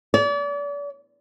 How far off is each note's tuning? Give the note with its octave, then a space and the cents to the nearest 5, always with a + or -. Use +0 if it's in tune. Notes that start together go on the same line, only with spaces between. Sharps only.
D5 -40